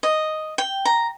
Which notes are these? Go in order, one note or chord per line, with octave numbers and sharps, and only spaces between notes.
D#5
G5
A#5